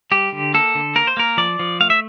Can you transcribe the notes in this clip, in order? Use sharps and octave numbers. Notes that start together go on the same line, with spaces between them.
G3 G4
D3
A#3 A4
D3
A#3 A#4
C5
A#3 A#4
F3 D5
F3
A3 F5
E5